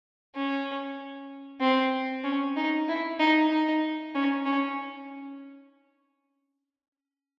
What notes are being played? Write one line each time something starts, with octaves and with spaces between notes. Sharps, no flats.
C#4
C4
C#4
D#4
E4
D#4
D#4
C#4
C#4